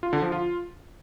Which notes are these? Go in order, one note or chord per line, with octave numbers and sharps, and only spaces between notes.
F4
D3
F3
F4